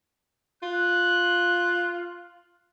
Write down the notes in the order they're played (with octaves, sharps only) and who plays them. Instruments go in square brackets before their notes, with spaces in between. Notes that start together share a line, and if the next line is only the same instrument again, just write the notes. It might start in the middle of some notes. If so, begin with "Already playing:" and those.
[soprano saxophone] F4 [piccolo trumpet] F#6